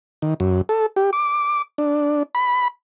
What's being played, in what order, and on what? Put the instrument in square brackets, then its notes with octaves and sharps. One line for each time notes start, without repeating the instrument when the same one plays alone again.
[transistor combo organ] D#3
F#2
A4
G4
D6
D4
B5